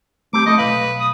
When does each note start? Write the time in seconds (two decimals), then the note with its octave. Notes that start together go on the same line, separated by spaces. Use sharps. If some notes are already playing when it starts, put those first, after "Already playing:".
0.33 A3 C4 G4 D6
0.46 A3 E4 A4 D#5
0.58 B1 B2 B4 F5
1.00 D#6